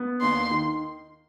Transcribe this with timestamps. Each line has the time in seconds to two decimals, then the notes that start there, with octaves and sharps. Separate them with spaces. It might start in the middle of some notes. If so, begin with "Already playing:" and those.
Already playing: B3
0.21 D#2 C6
0.50 D#3